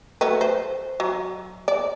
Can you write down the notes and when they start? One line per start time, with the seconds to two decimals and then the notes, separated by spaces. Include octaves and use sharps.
0.21 F#3 A3 B4
0.41 C5
1.00 F#3
1.68 D5